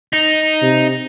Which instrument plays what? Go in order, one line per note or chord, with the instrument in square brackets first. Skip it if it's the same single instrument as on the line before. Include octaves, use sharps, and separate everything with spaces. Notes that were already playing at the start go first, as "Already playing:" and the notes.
[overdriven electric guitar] D#4
[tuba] C3